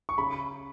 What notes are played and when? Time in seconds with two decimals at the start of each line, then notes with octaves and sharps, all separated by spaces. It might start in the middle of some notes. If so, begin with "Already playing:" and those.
0.09 C#6
0.18 C#3 B5